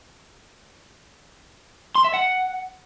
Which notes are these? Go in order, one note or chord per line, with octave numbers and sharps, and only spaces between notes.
C6
E5
F#5